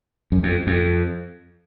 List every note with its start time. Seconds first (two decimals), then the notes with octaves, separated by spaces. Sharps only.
0.32 F#2
0.43 F2
0.67 F2